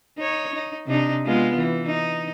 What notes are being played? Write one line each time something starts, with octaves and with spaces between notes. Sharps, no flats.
D#4 C#5
D#4
C3 D4 D#4
G#3 B3 F4
E3
D#4